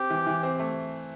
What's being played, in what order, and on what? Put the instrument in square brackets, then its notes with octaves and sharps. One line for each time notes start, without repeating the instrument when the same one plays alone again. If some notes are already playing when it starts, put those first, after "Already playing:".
Already playing: [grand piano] C4 [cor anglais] G4
[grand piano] E3
E3
C4
A3